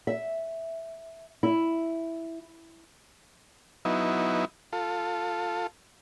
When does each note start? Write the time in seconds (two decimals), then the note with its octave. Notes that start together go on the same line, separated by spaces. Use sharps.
0.07 E5
1.43 E4
3.85 F#3 B3 D#4 E4
4.73 F4 A4